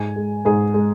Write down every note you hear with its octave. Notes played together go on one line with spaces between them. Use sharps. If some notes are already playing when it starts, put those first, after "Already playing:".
Already playing: G#2 G#5
G#3
G#2 G#4
G#3